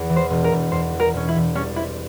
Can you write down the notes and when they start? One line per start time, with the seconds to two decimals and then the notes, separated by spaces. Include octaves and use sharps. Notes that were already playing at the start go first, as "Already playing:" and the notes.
Already playing: E2
0.10 E3
0.16 C5
0.30 E1
0.44 A#4
0.52 E1
0.72 E2 C5
0.93 E3
1.00 A#4
1.14 E1 C#4
1.28 E4
1.36 E1
1.55 G3 C#4
1.76 C4 E4